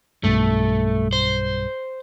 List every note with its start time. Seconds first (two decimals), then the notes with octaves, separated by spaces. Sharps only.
0.24 B1 G2 A3
1.13 C5